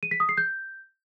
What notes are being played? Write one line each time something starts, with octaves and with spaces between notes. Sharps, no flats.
D#7
B6
D#6
C7
G6